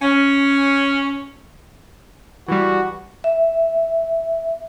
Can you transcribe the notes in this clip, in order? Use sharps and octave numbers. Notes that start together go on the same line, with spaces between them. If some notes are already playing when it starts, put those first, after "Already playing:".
C#4
E3 G3 F#4
E5